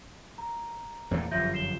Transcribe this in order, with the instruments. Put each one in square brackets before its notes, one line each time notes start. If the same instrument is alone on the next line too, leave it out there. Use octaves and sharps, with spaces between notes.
[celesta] A#5
[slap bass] E2 A#2 A3
[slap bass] G1 F#2 F3 [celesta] E5 G6 A#6
[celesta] C7 E7 G7